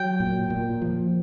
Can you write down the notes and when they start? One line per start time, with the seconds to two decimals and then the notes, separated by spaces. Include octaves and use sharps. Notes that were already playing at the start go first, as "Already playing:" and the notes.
Already playing: F#3 G5
0.20 A#2
0.50 A#2
0.82 F3